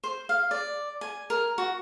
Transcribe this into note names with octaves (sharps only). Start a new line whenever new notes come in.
C5
F5
D5
G#5
A#4
F#4